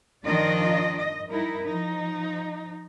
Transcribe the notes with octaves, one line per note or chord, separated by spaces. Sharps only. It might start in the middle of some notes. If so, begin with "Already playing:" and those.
D#3 F3 D4 F4 D5 D#5
D#5
G3 D#4 E4 A#4
F3 D#4